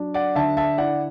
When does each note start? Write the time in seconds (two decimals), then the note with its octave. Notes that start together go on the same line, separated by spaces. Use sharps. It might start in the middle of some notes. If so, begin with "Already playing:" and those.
Already playing: F#3 D4
0.14 D5 F#5
0.35 D3 E5 A5
0.57 E5 A5
0.78 E4 D5 F#5